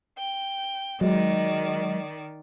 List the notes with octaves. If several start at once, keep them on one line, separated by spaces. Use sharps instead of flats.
G5
D#3 F#3 G#3 D5 D#5